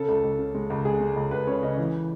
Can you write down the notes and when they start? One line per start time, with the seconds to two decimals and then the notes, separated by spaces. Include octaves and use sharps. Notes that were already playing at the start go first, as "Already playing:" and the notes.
Already playing: C#3 A4
0.08 C#2
0.23 C#2
0.38 C#3
0.55 G#3
0.70 C#2
0.85 G#3 G#4
1.01 G#3
1.16 C#2
1.31 C#2 B4
1.47 C#3 C#5
1.62 C#3 D#5
1.78 E3